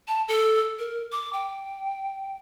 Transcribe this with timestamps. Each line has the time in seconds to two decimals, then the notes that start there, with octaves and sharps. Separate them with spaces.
0.08 A5
0.28 A4
0.79 A#4
1.12 D6
1.33 G5